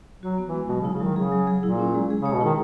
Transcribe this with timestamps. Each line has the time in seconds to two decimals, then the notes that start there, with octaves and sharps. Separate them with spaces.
0.22 F#3 F#4
0.38 B3
0.46 E3
0.53 G#3
0.69 B2 F#3
0.81 C#3
0.85 E4
0.93 C#3
1.00 D#3 F#3
1.16 C#3 G#4
1.32 F#3
1.47 G#4
1.63 A#2 E4
1.79 C#4
1.95 G#3
2.10 G#4
2.22 C#3
2.25 C#5
2.33 B2
2.41 D#3 E4